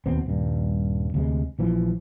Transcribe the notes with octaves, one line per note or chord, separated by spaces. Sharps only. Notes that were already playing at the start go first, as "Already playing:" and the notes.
D#2 B2 B3 C4
D#1 G2
D2 C3 G#3
A#1 E3 F3